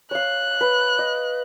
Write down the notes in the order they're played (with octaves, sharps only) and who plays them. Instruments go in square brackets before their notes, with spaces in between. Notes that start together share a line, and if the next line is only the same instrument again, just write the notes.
[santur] C#5 F5 [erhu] F#6
[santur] B4
D#5